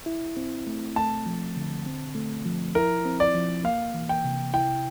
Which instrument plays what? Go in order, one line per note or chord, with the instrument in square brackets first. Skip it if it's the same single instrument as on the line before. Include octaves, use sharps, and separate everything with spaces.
[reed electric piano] E4
C4
A3
[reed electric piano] A3 [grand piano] A5
[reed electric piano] F3
D3
C4
A3
F3
[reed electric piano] E4 [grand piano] A#4
[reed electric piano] C4
[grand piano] D5
[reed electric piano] F3
[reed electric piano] A#3 [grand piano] F5
[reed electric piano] E3
[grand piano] G5
[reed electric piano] C3
[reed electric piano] E4 [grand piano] G5